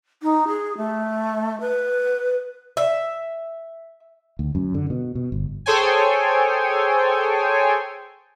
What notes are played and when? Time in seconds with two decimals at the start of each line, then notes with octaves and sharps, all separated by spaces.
0.22 D#4
0.47 G#4
0.77 A3
1.60 B4
2.77 E5
4.39 D2
4.55 F#2
4.74 D3
4.90 B2
5.15 B2
5.32 G1
5.66 G#4 A4 C5 C#5 G5 G#5